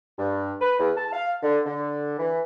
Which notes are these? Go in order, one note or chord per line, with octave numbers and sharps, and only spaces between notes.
G2
B4
E2
A5
F5
D3
D3
E3